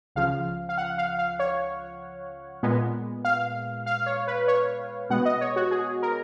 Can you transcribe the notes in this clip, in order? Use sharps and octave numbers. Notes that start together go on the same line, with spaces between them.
C#2 C#3 F3 F5
F5
F#5
F5
F5
C#5
A#2 G#3 B3
F5
F5
C#5
B4
C#5
B2 G#3 B3 F#5
D#5
C#5
F#4
G#4
A#4